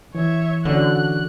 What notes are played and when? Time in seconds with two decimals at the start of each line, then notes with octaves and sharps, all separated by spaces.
0.15 E3 C#5 E5
0.65 D3 C#4 D4 F#4 F#6